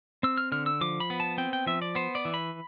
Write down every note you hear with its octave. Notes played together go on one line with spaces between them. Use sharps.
C4 E6
F6
D3 F6
E6
F3 D6
B5
B3
A5
C4 G5
G5
F3 E5
D5
B3 C5
D5
E3
B5